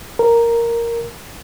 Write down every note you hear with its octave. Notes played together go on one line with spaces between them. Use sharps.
A#4